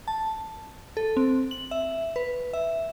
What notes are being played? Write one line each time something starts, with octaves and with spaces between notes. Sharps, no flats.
A5
A4
C4
F#7
E5
B4
E5